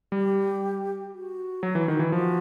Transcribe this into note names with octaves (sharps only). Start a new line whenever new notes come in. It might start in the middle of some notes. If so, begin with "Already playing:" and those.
G3 G4
F#4
F#3
E3
D#3
E3
F3 F#4